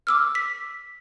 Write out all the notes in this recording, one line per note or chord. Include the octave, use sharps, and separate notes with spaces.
D6 E6 F6
B6